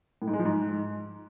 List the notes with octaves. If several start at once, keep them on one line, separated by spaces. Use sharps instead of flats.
A2
G#2
G#3
F3
G#2